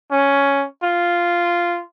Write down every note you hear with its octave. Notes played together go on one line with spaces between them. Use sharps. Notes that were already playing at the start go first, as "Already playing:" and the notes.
C#4
F4